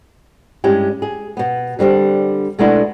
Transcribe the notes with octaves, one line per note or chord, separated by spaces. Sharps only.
G2 G#3 C#4 E4 G4
G#4
B2 B3
D3 G3 C4 D4
B2 G#3 A3 B3 D4 E4